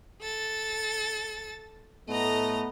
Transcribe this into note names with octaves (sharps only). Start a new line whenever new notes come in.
A4 A6
A2 A3 B3 D#5 A#5